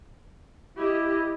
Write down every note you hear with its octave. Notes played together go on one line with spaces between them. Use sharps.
E4 G4 D#5